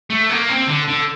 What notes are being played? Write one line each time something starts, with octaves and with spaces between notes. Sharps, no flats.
A3
A#3
C4
D3
D3